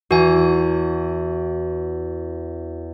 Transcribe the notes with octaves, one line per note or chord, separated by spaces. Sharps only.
E2 F#4 G#5